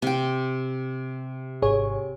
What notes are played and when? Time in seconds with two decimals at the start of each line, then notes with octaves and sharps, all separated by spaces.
0.02 C3 G5
1.62 G#1 G#4 C#5